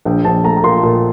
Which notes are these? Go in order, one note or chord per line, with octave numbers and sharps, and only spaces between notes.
A#1 G5
A#1 A5
A3 A#5
A#5
A#2 C6
A#2